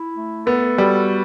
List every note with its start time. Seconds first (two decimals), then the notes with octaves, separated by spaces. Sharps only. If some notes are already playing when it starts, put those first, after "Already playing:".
Already playing: E4
0.14 A3
0.46 B3 A4
0.78 G3 F#4